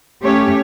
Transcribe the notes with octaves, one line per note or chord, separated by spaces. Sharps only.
A3 C#4 G4 C#5